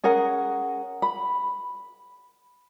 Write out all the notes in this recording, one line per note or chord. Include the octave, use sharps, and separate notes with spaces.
C#4 G#4 A#4 F#5
B5